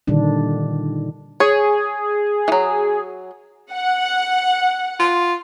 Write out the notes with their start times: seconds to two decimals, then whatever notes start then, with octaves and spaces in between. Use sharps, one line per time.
0.07 A#2 D3 D#3 G3 D4
1.40 G#4 C#5
2.48 E3 F#3
3.72 F#5
5.00 F4